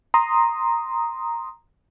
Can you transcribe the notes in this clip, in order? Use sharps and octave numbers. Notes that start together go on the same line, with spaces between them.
A#5 C6 D#6